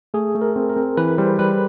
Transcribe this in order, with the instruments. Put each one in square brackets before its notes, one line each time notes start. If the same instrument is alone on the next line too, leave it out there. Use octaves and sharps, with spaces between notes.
[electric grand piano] A3 [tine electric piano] G#4
[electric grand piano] A3
[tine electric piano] A#4
[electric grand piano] C4
[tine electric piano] A#4
[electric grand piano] C4
[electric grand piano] E3 [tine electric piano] B4
[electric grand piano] G3 [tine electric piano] C5
[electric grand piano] G3 [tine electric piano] B4